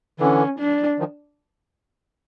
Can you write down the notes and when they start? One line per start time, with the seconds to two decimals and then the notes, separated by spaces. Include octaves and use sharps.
0.20 D3 E3 C#4
0.59 D4
0.99 D#3 F3